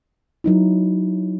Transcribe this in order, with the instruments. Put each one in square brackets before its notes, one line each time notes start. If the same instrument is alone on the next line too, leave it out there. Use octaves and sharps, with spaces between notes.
[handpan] F#3 D#4 E4